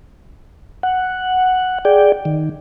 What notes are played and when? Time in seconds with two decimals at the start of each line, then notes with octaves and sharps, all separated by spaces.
0.83 F#5
1.85 G#4 D5 G5
2.25 D#3